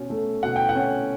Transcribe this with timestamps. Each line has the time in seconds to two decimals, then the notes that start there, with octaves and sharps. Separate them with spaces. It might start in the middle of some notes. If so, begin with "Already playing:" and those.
Already playing: B2 C#4
0.10 A3
0.43 B2 F#5
0.56 G5
0.69 F#5
0.76 C#4